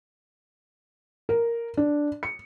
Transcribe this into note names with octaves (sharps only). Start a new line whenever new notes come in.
A#4
D4
C#7